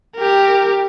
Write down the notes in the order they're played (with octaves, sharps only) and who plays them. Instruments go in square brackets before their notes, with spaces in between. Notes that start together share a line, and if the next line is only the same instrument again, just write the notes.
[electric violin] G4 A#4